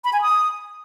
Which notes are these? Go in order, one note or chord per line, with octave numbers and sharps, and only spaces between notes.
B5
G#5
D#6